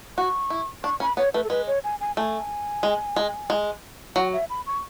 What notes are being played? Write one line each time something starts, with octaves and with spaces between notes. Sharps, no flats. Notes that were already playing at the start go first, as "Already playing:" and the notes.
F#4 C#6
E4
D4 C#6
C#4 B5
B3 C#5
A3 B4
A4
G#3 B4
C#5
G#5
G#5
A3 G#5
G#3
G#3
G#3
F#3 F#5
E5
B5
C#6